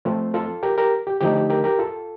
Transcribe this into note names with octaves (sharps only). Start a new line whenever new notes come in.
F3 A3 C4 F4
F4 A4
G4 A#4
G4 A#4
G4
D3 F3 A3 D#4 G4
G4
G4 A#4
G4 A#4
F4 A4